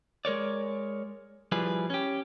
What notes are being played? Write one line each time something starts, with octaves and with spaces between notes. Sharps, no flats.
G#3 A#4 C#5 D5
F3 G3 E4 G#4 B4
C#4 G4